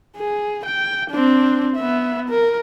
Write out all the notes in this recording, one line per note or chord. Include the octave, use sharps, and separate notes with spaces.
G#4
G5
C4 D4
B3 E5
A#4